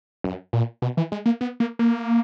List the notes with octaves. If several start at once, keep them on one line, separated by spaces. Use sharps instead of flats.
F#2
A#2
B2
E3
G#3
A#3
B3
A#3
A#3